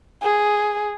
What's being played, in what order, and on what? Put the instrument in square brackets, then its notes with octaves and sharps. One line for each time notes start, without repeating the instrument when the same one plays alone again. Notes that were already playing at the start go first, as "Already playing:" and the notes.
[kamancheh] G#4